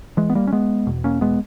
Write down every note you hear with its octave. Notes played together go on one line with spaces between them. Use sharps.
E3 G#3
B3
G3 A#3
C#4
G#3 B3
E2 B2
A#3 C#4
G#3 B3